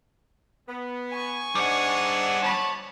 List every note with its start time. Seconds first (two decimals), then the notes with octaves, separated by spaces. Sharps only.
0.69 B3
1.10 G#5 C#6
1.55 G#2 G3 D4 D5 F#5
2.43 C#5 A5 B5